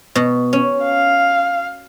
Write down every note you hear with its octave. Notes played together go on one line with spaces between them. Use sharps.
B2
C#4
F5